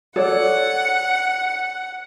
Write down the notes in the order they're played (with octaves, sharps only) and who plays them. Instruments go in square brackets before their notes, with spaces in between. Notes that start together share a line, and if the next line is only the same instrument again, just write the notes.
[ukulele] A4 C#5 D5 [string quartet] F#5